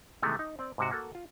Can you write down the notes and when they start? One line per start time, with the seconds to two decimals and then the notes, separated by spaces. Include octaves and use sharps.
0.22 C3 D#3 E3 G#3 A3 B3
0.39 D#4
0.59 C4 D5
0.78 G#2 C3 F#4
0.91 A#3 F#4 A4
1.15 F4